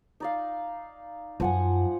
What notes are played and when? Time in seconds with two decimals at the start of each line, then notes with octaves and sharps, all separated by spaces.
0.20 D#4 D5 F5
1.40 F#2 F3 F#5 G#5